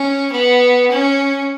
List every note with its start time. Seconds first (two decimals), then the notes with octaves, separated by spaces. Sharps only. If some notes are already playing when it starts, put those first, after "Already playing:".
Already playing: C#4
0.32 B3
0.91 C#4